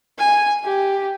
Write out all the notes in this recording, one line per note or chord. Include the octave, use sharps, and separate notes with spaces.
G#5
G4